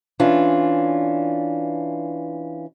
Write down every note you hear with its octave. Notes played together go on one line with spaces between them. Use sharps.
E3 C#4 D4 F4